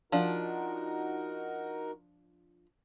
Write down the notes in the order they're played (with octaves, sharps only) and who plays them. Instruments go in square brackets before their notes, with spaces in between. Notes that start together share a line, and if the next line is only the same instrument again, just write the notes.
[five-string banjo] F3 D4 [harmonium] D#4 F#4 A#4